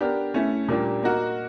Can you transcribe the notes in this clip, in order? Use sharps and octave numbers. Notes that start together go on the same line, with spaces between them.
B3 D4 G4 A#4
A3 C#4 E4
A#2 G3 A#3 D4 G4
A#3 D#4 F#4 A#4